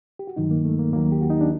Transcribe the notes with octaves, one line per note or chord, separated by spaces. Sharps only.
G4
F#4
G2 D#3 F#3 D#4
A#3
A3
A#3
D#2 D#3 F#3 A#3
G4
F#4
D#4
D4